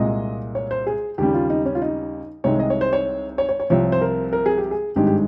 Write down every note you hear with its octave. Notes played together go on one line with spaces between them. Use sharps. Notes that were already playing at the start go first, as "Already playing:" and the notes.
Already playing: C2 A#2 G#3 D#5
C#5
C5
G#4
D#2 C#3 G3 G4
F4
D#4
C#4
F4
D#4
C2 C3 D#3 G#3 C#5
D#5
C#5
C5
C#5
C#5
C#5
C#5
C2 C3 F3 C#5
C5
A#4
A#4
G#4
G4
G#4
G#1 G2 D#3 G#3 G4
G4